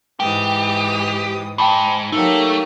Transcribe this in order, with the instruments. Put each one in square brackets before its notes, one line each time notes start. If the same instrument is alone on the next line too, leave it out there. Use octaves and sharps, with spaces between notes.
[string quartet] G#2 E3 D#6 [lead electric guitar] G4 [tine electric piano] G5
[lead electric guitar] G#2 [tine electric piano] G5 A5 B5
[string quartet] F#3 A#3 G4 [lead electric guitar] A3 [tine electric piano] D#4